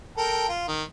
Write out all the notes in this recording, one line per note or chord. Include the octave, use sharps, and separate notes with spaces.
A4 A#4 G5
F4
D#3